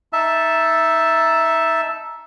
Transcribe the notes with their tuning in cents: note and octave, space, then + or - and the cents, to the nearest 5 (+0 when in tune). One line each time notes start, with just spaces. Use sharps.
D#4 +10 E5 +0 A5 +0